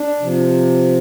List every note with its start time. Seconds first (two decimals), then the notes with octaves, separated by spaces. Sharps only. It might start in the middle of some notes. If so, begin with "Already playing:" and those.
Already playing: D4
0.21 C3 F3